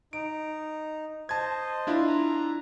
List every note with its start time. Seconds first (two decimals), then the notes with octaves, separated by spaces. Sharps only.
0.13 D#4 D7
1.29 C5 D#5 A5 G#6
1.87 D4 E4 F4
2.07 A#5